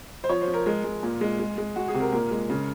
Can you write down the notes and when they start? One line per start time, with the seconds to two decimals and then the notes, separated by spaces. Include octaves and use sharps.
0.24 C5
0.29 F3 C#5
0.41 C5
0.48 F3
0.54 A#4
0.66 G#3 A#4
0.84 G#3
1.03 A#2
1.21 G#3
1.39 G#3
1.58 G#3
1.76 G#3 F#4
1.88 G#4
1.94 C3
2.00 A#4
2.12 A#2 A#4
2.31 G#3
2.50 C#3